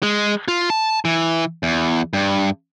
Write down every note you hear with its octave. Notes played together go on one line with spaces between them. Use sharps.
G#3
F4
A5
E3
E2
G2